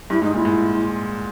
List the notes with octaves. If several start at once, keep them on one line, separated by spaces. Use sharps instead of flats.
G2 E4
G#2 D#4
A#2 E4
G#2